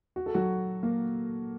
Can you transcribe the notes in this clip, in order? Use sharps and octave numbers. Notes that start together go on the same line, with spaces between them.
F#4
A4
F#3 F#4
A#3 A#4